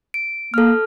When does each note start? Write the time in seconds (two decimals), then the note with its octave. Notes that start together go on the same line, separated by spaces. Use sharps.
0.14 D7
0.54 A#3 A4 F6